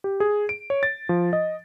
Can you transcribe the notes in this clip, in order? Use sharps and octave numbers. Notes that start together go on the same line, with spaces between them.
G4
G#4
D7
C#5
A6
F3
D#5